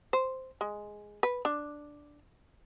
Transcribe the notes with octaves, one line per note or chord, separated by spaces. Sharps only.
C5
G#3
B4
D4